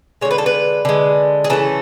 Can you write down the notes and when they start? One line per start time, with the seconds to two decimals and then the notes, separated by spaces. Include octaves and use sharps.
0.21 D3 G#3 C#5
0.31 B4
0.38 A4
0.46 B4
0.85 D3 G#3
1.44 G#4
1.50 C#3 E3 A3 A4